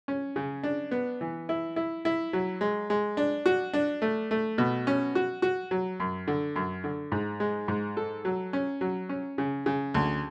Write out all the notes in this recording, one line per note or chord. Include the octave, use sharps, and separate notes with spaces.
C#4
C#3
D4
B3
E3
E4
E4
E4
F#3
G#3
G#3
D4
F#4
D4
A3
A3
B2
C#4
F#4
F#4
F#3
F#2
D3
F#2
D3
G#2
G#3
G#2
A4
F#3
C#4
F#3
C#4
C#3
C#3
D2